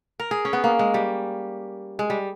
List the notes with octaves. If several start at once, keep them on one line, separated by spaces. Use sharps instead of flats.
A#4
G#4
C#4
B3
A#3
G#3
G3
G#3
G3